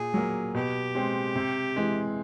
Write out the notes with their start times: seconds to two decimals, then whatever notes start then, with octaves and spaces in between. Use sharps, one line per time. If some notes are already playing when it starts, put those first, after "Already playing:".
Already playing: A#2 G#4
0.14 F#3 A#3
0.54 B2 G4
0.95 G#3 C4
1.35 C3
1.76 E3 G#3